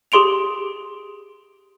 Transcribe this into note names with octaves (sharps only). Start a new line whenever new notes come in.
G4 G#4 C6 D7 F7